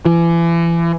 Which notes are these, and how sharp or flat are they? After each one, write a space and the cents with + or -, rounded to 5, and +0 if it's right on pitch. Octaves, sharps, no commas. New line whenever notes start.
E3 +35